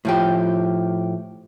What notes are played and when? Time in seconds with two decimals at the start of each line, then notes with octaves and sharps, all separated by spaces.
0.05 A2 F3 G4